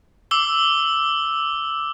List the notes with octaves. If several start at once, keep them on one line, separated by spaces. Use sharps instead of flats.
D6 E6 G7